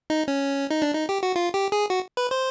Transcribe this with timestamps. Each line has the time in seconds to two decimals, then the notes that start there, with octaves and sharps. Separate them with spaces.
0.10 D#4
0.28 C#4
0.70 D#4
0.82 D4
0.95 D#4
1.09 G4
1.23 F#4
1.36 F4
1.54 G4
1.72 G#4
1.90 F#4
2.17 B4
2.31 C5